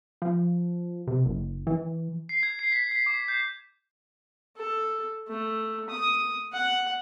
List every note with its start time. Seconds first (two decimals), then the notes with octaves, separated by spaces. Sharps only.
0.22 F3
1.07 C3
1.25 F#1
1.67 E3
2.29 C7
2.43 G#6
2.59 C7
2.72 B6
2.91 B6
3.06 D6
3.28 G6
4.57 A4
5.28 A3
5.90 D#6
6.53 F#5